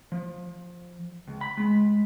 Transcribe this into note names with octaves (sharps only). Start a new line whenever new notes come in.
F3
C#2
B5
G#3